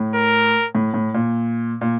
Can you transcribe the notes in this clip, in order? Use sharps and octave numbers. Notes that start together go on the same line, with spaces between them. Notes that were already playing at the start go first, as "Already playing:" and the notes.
Already playing: A2
A#4
A2
A2
A#2
A#2